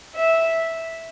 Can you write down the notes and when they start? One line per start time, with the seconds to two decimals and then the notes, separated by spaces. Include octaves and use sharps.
0.14 E5